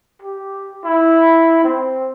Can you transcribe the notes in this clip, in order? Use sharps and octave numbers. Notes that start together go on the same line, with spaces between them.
G4
E4
C4